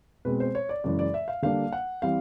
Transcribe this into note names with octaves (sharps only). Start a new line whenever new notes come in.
B2 G#3 C4 B4
C5
C#5
D5
F#2 C#3 E3 G#3 D5
D5
E5
F5
D3 G3 A#3 D4 F5
F#5
E3 G3 C4 F5